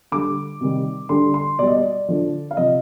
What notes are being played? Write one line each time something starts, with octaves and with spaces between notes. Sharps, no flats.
D3 G3 D6
C3 D#3 G3
D3 G3 C6
C6
B2 G3 D5
D#5
D5
D3 F3
F5
C3 F3 D#5